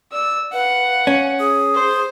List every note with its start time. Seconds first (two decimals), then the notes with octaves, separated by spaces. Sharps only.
0.12 D5 E6
0.53 B4 F5 F#5
1.07 C#4
1.40 G#4 D#6
1.75 C5